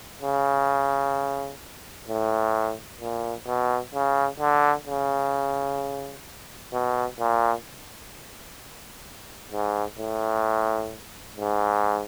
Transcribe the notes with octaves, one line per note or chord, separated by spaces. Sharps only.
C#3
A2
A#2
B2
C#3
D3
C#3
B2
A#2
G#2
A2
G#2